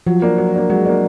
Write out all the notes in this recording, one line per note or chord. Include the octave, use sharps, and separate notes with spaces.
F3 F#3
A#3 D4
F#3
A#3 D4
F#3 G#3
A#3 D4